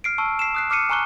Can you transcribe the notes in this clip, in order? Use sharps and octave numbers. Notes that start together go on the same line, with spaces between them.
F6 C7 D7
A5 C#6 E6
C7 E7
D#6 F#6 C7
D6 F6 C7 C#7 D#7
G#5 A#5 C#6 F#6 G7